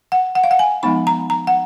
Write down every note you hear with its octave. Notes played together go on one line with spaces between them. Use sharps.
F#5
F#5
F5
F#5
G#5
F3 G#3 B3 D#4 B5
A#5
A#5
F#5